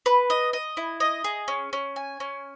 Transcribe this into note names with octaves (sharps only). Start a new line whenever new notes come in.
B4
D#5
D#5
E4
D#5
G#4
C#4
C#4
G#5
C#4